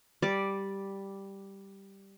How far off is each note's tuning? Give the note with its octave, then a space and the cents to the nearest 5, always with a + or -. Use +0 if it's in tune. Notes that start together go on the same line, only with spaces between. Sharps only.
G3 +0 D5 +0